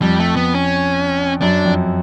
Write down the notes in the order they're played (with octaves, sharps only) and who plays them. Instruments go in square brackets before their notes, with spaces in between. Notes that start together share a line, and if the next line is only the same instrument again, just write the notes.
[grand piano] F2 [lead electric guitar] G3
[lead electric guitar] A3
B3
C#4
[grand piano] F#2 [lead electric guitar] D4
[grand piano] F2